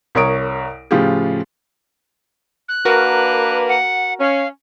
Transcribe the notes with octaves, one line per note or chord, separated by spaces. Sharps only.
C2 A#4 C#5 C#6 D#6 D7
A2 C#3 F3 F4 G4 G#4
F#6
A#3 D4 F#4 A#4 B4
F#5
C#4 F5